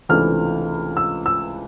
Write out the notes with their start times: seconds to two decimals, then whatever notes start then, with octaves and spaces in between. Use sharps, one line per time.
0.09 C#2 C3 E3 A3 D4 F6
0.97 E6
1.26 E6